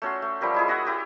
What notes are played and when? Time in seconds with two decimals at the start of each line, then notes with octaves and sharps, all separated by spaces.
0.02 A3 C#4 F#4 C6
0.22 A3
0.41 F3 G3 G4 A#4
0.54 G#3 E4 G#4
0.68 F#4 D#5 E5 F#5
0.85 E4 G4 A4